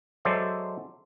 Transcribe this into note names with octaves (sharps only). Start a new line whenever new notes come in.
F#3 G#3 A4 C5 D5 E5